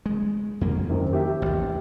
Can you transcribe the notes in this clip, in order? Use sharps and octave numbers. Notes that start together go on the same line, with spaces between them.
G#3
F2 A#3
F#2 D#3 C4
G4 E5
A1 D#2